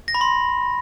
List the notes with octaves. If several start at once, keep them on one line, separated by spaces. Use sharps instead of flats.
A#6
B5
C6